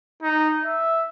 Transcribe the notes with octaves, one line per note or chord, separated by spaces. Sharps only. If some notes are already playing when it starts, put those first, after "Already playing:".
D#4
E5